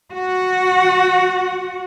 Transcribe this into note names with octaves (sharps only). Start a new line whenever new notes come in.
F#4 F#5